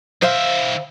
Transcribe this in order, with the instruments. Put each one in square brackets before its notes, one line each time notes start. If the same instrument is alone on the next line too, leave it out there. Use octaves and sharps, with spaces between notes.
[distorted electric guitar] D#3 E5 [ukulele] C5 F5